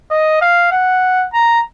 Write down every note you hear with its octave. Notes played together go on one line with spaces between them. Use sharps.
D#5
F5
F#5
A#5